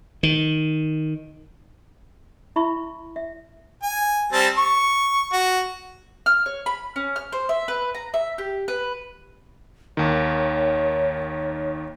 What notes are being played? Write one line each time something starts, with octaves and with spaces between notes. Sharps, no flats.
D#3
E4 E5 B5 C#6
E5
G#5
G3 C4 A5
C#6
F#4
F6
C#5
B5
C#4
F6
C5
E5
B4
A#5
E5
G4
B4
D#2 D#3 C#5